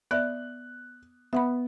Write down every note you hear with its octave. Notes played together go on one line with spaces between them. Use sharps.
B3 D5 E5 F#6
B3 E5 F#5 B5